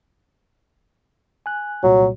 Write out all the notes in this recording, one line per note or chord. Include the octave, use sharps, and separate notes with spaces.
G#5 F#6
C2 A#2 F#3